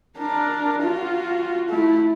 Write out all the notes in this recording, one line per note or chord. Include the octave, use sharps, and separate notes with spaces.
D4 A#4
F4 F#4
A3 E4